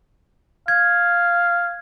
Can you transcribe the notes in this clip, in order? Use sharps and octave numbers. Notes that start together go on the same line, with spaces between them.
F5 G#6